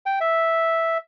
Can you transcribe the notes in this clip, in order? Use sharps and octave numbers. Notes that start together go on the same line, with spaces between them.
G5
E5